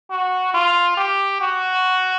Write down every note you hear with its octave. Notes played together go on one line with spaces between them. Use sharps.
F#4
F4
G4
F#4